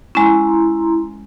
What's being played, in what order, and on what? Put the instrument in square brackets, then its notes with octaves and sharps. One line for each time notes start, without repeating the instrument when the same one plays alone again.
[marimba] G#3 C#4 [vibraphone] E4 A#5 C6